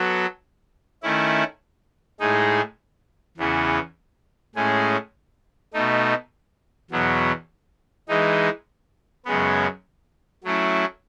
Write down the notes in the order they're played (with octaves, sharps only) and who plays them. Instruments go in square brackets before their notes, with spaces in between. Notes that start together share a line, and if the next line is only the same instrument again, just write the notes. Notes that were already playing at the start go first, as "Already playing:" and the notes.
Already playing: [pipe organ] F#3 B3 F#4 A4
D#3 A3 C#4 E4
A2 G#3 D#4 G#4
E2 C#3 E3 B3
A2 G#3 C#4 G#4
B2 A3 D#4
E2 B2 F#3 B3
E3 G#3 D#4
F#2 C#3 G#3 B3
F#3 A3 C#4 E4